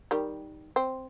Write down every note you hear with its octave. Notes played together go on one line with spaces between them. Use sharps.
D#3 G3
C4